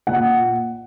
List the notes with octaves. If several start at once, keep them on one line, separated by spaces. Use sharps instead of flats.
A#2 F#5